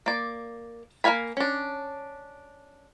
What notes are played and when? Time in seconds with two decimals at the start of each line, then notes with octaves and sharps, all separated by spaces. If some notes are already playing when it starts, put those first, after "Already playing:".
0.06 A#3 D5
1.04 A#3 A4 F5 G#5 B5
1.37 C#4 D4